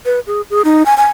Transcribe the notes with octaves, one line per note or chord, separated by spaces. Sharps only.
B4
G#4
G#4
D#4
G#5
G#5